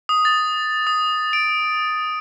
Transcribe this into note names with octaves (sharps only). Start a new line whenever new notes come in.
D#6
A6
D#6
D7